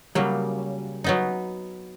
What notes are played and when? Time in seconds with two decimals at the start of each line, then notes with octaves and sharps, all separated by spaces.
0.15 C#3 F#3 G3 A#3
1.04 F#3 B3 D#4